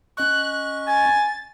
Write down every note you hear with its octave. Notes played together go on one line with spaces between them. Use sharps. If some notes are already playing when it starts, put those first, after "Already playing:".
C#4 D#5 C#6 F#6
G#5 A6